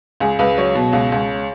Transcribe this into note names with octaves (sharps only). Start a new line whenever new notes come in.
C#2 G#4
C#2 B4
F#3 C#5
B2
C#2
C#2